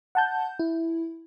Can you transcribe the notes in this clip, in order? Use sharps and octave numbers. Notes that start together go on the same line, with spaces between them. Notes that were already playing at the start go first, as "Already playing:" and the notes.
F#5 A5 G6
E4